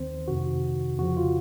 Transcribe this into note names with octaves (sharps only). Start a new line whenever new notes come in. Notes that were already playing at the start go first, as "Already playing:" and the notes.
Already playing: D#2 D#3 C4 C5
F2 C3 D#3 F#4
F2 C#3 F3 F#4
F4